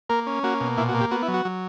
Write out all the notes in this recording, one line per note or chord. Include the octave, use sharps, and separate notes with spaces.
A#3 A#4
C#4
A#3 F#4
B2
A#2 E4
F#4
A#3
G4
B3 F#4
E4
F#3
F#4
F#3